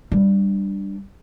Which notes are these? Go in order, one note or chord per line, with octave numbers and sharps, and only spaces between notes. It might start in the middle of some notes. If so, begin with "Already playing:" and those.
G3 D4